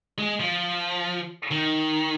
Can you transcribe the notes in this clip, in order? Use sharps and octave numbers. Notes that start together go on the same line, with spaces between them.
G#3
F3
D#3